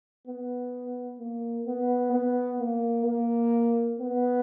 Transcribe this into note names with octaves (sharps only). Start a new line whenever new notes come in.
B3
A#3
B3
B3
A#3
A#3
B3